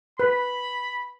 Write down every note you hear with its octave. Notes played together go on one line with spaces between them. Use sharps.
B4 B5